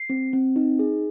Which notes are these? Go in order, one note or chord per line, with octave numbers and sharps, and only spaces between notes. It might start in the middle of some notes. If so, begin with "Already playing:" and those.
Already playing: C7
C4
C4
D#4
G#4